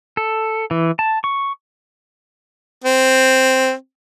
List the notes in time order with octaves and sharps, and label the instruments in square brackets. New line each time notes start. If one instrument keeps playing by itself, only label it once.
[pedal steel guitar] A4
E3
A5
C#6
[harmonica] C4